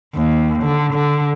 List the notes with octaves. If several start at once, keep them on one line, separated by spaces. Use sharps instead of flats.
D#2
D3
D3